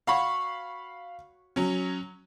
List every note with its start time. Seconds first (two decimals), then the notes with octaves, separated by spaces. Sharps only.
0.07 F#4 C#5 F5 B5
1.56 F#3 C#4